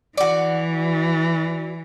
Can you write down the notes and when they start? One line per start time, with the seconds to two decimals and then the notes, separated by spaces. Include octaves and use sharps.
0.17 E3 F#4 D5